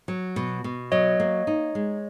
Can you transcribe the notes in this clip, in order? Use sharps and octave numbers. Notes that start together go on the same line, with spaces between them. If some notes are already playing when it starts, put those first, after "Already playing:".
F#3
B2
B2
F#3 C#5 D#5
A#3
D#4
G#3